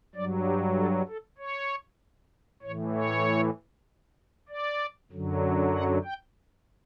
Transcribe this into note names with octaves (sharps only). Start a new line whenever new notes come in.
G2 F#3 D5
G4
A4
A4
C#5
A2 E3 C#5
C#5
D5
F#2 D3 F#3
F#5
G5